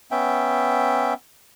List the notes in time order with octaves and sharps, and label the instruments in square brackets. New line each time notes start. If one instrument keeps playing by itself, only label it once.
[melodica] B3 C#4 E5 G5